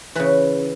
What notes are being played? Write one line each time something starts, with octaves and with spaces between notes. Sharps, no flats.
C#3 E3 B4